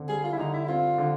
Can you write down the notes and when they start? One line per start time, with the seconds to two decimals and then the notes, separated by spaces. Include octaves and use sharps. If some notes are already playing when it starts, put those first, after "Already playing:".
Already playing: D3 C4
0.09 G3 G#4
0.24 F4
0.32 E4
0.38 D3 D#4
0.54 E4
0.65 E4
0.68 C4 F4
0.98 D3